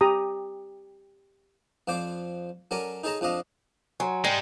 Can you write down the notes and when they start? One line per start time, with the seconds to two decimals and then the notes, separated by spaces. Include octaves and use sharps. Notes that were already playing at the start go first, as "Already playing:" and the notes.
0.01 G4 A#5 D#6
1.88 F2 F3 C5 D5 D6
2.71 F#3 C#4 A4 A#4 D5 G#5
3.04 D#4 G#4 A4 C#5 A5 A#5
3.21 F2 F3 D4 D#5 F5
4.00 F#3 G#5 A#5 C6
4.24 G3 G#3 D#4